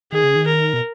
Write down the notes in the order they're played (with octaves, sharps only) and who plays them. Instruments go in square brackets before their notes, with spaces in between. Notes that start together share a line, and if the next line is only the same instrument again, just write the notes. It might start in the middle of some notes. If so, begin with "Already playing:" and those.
[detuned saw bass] D#3 [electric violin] G#4
[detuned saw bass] C#3
D#3
[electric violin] A#4
[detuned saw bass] B2